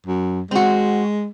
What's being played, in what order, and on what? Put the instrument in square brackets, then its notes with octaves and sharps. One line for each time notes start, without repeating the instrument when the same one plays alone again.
[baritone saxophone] F#2
[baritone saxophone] G#3 [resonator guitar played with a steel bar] C4 F#4